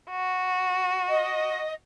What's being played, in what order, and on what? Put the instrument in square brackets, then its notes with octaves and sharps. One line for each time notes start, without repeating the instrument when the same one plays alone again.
[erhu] F#4
[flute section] D#5